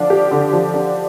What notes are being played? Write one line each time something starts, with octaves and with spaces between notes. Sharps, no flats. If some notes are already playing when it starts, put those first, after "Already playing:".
Already playing: D3 F3 D4
G4
D3
F3
D4